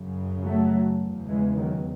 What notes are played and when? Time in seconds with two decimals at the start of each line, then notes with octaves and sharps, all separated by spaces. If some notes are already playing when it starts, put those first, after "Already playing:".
Already playing: F#2 C#3
0.44 F#3 A3
1.01 E2 C#3
1.29 E3 G#3
1.57 D#3 F#3